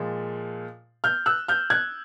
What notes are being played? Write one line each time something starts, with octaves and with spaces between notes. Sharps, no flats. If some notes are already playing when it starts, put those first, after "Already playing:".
Already playing: A#2 F3 G#3
F6 G6
E6 F#6
F6 G6
F#6 G#6